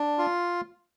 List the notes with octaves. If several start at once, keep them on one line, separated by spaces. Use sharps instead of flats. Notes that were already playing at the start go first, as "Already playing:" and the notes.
Already playing: D4
F4